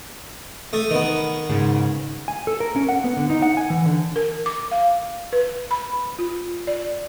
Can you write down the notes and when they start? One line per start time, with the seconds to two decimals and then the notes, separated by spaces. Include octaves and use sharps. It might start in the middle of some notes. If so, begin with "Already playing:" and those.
0.73 A3 D#6
0.90 D#3 B3
1.49 G#2 C#3
2.28 G#5
2.47 A4
2.60 A#4
2.76 C#4
2.89 F#5
3.04 B3
3.17 D3
3.30 D#4
3.42 F#5
3.57 G#5
3.70 E3
3.86 D3
4.16 A#4
4.46 D6
4.71 F5
5.33 B4
5.71 B5
6.19 F4
6.67 D5